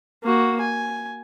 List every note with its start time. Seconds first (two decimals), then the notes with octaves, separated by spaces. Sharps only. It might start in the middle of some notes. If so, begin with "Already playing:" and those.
0.23 A#3 F#4
0.60 G#5